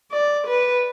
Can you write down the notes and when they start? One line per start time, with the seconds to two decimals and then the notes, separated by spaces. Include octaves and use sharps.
0.12 D5
0.47 B4